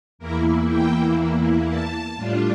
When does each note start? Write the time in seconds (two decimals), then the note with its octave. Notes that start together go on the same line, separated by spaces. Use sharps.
0.19 E2 E3 A#3 E4 A#4
0.67 G5
1.67 A5
2.16 A2 G3 D4 F4